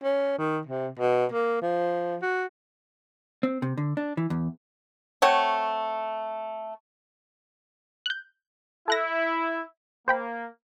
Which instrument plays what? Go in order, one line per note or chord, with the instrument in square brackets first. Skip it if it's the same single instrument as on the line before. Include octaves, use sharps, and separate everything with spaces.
[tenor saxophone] C#4
D#3
C3
B2
A#3
F3
F#4
[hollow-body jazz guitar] C4
C3
D3
D4
E3
E2
[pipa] A3 C4 C#5 F#5
[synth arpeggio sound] F#6 G6
[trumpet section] E4 [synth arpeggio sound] A4 F#6 A#6
[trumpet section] A#3 [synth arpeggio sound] C5 G5 B5